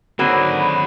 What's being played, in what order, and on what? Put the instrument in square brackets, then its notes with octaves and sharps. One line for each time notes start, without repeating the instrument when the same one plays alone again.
[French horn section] D3 F#3 [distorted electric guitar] D#3 G#4 [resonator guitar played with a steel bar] A#3 C4 F#4 [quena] B5